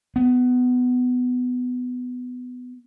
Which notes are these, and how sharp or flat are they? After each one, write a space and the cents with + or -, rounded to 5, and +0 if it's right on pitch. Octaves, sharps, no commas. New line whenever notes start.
B3 +15